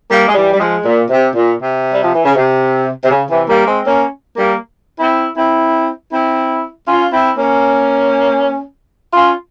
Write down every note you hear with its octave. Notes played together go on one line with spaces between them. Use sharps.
G3 A#3
G#3
E3 G3
G3
F3 G#3
A#2
C3
A#2
C3
G3
F3
E3
C#3
C3
C3
C#3
C3 E3
G3 A#3
G#3 C4
A#3 C#4
G3 A#3
C4 E4
C4 E4
C4 E4
C#4 F4
C4 E4
A#3 C#4
C#4 F4